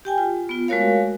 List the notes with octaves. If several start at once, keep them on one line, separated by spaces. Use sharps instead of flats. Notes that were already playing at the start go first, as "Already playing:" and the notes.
G4 G5 G#5
F4
B3 F4
G#3 A3 F#4 A#4 C#5 F5